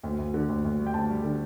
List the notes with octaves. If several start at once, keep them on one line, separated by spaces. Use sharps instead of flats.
D2
D2
D3
D2
D2
G3
G5
D2 A5
G3
D3